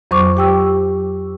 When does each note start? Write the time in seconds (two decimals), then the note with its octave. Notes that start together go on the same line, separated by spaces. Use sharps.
0.11 F2 F#3 C5 C#6 D6
0.37 G4 G5 E6